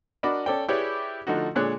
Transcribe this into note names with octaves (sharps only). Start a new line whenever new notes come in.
D4 F#4 A#4 D5 D#5 B5
C#4 A4 D5 G5
E4 G4 G#4 B4 C#5 D5
D3 F3 A3 D#4 F#4
A#2 D3 G#3 D4 C#5 F#6